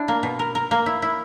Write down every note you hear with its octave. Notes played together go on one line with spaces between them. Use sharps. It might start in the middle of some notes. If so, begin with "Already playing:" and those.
Already playing: D4 E4
A#3
B2
A#4
A#4
A#3
E4
E4